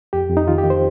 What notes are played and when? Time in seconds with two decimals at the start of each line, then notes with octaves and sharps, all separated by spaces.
0.13 F2 G4
0.30 F2
0.37 D#4
0.47 D#3 F4
0.58 G4
0.64 D#3
0.70 C5